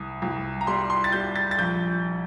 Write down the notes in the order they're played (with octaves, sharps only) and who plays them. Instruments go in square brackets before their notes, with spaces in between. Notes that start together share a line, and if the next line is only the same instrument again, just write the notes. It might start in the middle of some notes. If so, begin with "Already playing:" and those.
Already playing: [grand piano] C2 D#6
C2
A#5
G3 C6
C6
A6
G3 G6
A6
A6
A#1 G6